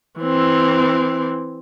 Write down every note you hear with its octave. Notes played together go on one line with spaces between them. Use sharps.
E3 C4